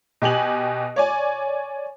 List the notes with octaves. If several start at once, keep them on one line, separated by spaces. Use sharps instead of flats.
B2 G4 G#5 F#7
C#5 D5 G#5